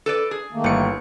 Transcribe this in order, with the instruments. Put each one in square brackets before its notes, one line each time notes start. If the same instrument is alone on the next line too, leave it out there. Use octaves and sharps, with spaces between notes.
[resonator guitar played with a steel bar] A4 B4 D5
G#4
[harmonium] D#3 A3 A#3
[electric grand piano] G1 C#7 [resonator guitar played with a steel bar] A2